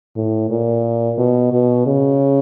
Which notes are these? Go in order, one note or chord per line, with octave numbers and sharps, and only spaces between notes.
A2
A#2
B2
B2
C#3